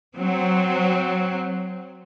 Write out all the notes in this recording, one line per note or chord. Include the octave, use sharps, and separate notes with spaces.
F#3 C4